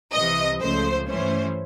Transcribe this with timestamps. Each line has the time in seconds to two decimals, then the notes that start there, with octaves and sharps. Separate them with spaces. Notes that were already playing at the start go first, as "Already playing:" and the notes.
0.13 C2 C3 E3 D#5
0.61 C#2 C#3 F3 A3 C5
1.08 G2 E3 A3 C#4 C5